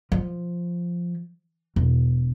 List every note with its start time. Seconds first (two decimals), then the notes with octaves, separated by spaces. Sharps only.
0.12 F3
1.76 E1